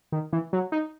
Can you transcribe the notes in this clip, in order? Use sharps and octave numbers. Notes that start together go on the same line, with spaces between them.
D#3
E3
F#3
D#4